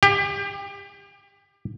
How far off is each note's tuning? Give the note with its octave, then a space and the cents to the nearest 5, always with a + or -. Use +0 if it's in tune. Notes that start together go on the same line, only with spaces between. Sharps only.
G4 +25